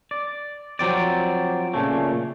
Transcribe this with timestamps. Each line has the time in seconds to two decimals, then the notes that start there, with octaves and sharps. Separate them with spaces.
0.11 D5
0.79 F3 F#3 C4 D5
1.74 A#2 C#3 A3